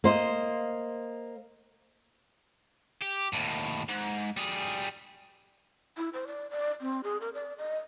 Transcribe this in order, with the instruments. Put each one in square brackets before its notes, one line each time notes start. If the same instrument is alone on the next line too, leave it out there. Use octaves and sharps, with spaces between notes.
[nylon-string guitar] A#3 C5 D#5
[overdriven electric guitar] G4
D#2 A2
G#2
G3 G#4
[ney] E4
C5
D5
D5
C4
G#4
A#4
D5
D#5